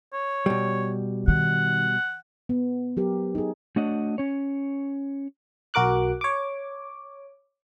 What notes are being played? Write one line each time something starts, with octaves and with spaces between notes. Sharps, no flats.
C#5
B2 G3
D#3 F#5
B3
F#3 G4 A#4
D#4 G#4
A3 D4 F#4 C#5 D#5 F#5
C#4 C#5
B1 F#4 A#4 D6 F#6
C#5 D6